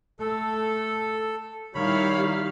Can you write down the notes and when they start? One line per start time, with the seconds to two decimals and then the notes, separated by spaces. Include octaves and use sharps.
0.19 A3 A4
1.75 D#3 G3 E4 C#5 F5 B5